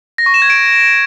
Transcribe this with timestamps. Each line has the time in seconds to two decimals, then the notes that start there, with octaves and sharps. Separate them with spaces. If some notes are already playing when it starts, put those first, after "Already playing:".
0.18 A#6
0.26 C#6
0.34 E7
0.42 G#6
0.50 D7